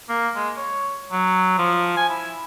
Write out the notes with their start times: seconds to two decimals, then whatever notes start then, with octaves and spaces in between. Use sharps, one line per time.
0.09 A#3
0.35 G#3
0.57 C#5
1.12 F#3
1.58 F3
1.96 G#5
2.09 E4